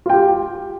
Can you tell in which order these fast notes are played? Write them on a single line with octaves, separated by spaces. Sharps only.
F4 G5 G4